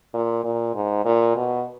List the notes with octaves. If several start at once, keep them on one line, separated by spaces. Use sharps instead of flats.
A#2
A#2
G#2
A#2
B2